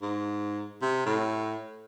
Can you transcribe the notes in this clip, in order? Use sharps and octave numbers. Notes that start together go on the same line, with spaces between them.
G#2
C3
A2